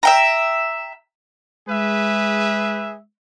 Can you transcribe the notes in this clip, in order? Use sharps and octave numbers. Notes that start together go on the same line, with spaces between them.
E5 G5 A#5
G#3 G#4 B4 E5